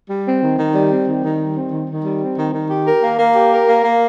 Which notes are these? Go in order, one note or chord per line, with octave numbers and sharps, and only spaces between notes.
G3
C4
D#3
D#3
G3
C4
D#3
D#3
G3
C4
D#3
D#3
G3
C4
D#3
D#3
G4
A#4
A#3
A#3
G4
A#4
A#3
A#3